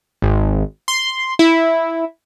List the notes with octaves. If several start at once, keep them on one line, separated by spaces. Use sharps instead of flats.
G#1
C6
E4